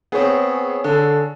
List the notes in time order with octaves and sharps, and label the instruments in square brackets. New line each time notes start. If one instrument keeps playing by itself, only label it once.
[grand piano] B3 C4 [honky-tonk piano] G#4 C#5
[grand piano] D3 [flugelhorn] A4